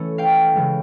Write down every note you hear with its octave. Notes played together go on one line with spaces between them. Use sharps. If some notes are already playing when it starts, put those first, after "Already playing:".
Already playing: E3 A3 C#4
F5 G5
C#3 E3 G#3